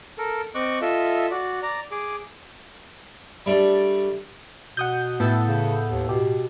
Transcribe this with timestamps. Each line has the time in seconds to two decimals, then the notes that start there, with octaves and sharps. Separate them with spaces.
0.18 A4 A#4
0.55 C4 D#5 C#6 D6 F#6
0.81 F4 A4 D#5 E5
1.31 F#4 D5
1.63 D5 A#5
1.91 G#4 D6
3.46 G3 A3 D4
4.77 B2 F#5 D#6 G6
5.20 A2 B3 E4 A4
5.47 C#3
5.88 D#2
6.09 B2 G4